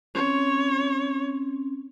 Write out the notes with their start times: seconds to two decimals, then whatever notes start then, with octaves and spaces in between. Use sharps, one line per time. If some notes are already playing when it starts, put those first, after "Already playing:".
0.15 C4 C#4 C#5